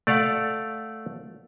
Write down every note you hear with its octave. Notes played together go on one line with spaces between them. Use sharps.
A3 D5 F5 F#5